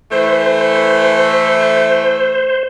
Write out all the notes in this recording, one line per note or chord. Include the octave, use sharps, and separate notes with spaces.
E3 A3 C5